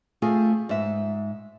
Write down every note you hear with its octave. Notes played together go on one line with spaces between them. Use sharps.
A3 C4 F4 G#4
G#2 E5